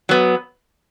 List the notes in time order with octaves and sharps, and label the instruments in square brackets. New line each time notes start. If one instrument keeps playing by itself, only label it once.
[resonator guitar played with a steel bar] F#3 B3